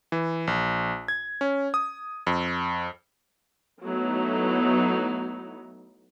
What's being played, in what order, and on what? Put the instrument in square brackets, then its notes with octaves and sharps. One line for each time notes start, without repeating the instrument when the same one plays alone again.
[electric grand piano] E3
A#1
G#6
C#4
D#6
F2
[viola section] F#3 A3 B3 D#4 E4